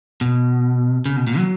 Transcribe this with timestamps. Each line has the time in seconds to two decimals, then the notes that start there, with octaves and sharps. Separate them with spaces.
0.21 B2
1.06 C#3
1.16 B2
1.27 A#2
1.37 F#3